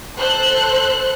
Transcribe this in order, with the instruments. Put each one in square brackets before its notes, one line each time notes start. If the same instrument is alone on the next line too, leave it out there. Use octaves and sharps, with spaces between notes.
[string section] A4 C5 F#6